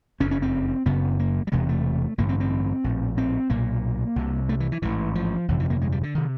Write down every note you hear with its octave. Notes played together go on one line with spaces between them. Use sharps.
F#1 F2 C#3 C#4
C#4
C4
F#1 F#2 C#3 B3
A#3
G3
E1 E2 C3 G#3
A3
A1 G2 D3 A#3
C4
C4
A#1 A2
C4
B1 A#2 A#3
C2 C3
A3
E3
E3
A1 G#2 E3
F3
G1 F2 C3 E3
E3
A#3
G#3
G3
D3
C3 D#3